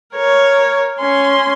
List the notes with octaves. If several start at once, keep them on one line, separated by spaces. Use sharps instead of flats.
A#4 C#5
C#4 C6